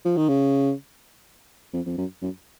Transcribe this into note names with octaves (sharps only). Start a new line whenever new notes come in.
F3
D#3
C#3
F2
F2
F#2
F#2